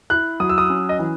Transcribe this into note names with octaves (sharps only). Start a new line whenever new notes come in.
E4 F#6
F#3 D#6
E6
D#6
C#4
D#5
E3